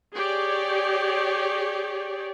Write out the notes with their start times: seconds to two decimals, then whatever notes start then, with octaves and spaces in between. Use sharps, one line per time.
0.14 G4 G#4 C#5 D5